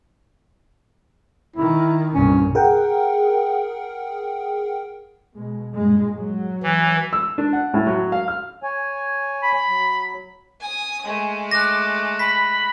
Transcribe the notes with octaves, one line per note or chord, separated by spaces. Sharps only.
D#3 E4
C2 G2 A#2 C#4
G#4 A#4 F#5 G5
B2 G#3
G2 A#2 G#3
F#3
E3
E6
D4
F#5
A2
F#3
F5
F6
C#5 G#5
B5
F#3
G#5 D#6
G#3 A3 G#5
D6 F#6 A#6
B5 B6